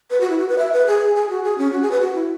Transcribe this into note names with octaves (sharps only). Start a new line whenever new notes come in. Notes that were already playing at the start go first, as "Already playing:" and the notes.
B4
F#4
E4
F#4
B4
E5
B4
G#4
G#4
F#4
G#4
C#4
F#4
G#4
B4
F#4
E4